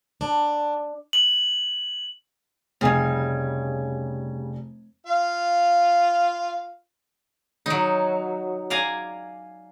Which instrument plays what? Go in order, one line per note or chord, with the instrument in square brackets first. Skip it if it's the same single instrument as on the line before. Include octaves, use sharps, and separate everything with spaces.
[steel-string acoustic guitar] D4
[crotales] F#7
[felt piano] F1 G#5 [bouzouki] C#3 G3
[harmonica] F4 F5
[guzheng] F#3 D#4
D5 F5 G#5 A#5